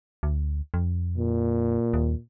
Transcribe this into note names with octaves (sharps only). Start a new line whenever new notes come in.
D2
F2
A#2
D#2